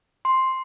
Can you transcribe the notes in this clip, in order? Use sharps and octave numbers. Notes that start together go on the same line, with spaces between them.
C6